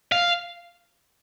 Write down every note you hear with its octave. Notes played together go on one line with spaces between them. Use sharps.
F5